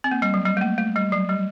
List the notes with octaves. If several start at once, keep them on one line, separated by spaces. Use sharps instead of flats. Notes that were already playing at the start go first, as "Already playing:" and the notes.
C4
A#3
G3
F#3
G3
A3
A#3
A3
G3
F#3
G3